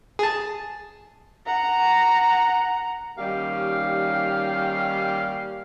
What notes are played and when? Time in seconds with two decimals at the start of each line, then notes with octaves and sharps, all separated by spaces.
0.19 G#4 A5
1.46 F#5 A#5
3.18 D#2 D#3 G3 C#4 G4 F5